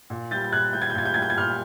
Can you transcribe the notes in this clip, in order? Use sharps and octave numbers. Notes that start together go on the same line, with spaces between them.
A#2
G3 G6 A6
G6
A#2 F#6 G#6
G3 G6
G#6
G6
A#2 G#6
G6
G3 G#6
G6
G#6
A#2 F6 G6